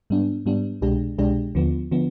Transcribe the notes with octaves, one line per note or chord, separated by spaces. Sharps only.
G#2 G3 B3 D4
G#2 G3 B3 D4
C2 B2 G#3 D4 G4
C2 B2 G#3 D4 G4
D#2 D3 F3 B3
D3 F3 B3